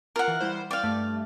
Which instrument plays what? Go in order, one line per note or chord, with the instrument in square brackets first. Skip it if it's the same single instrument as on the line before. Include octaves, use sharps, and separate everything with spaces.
[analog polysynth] F4 [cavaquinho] A#4 F#5
[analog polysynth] E3
G3 E4 C5
[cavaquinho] D5 F5 [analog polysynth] G5
[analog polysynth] G2 A3